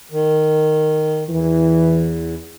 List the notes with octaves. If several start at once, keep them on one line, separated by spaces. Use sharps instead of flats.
D#3
E2 E3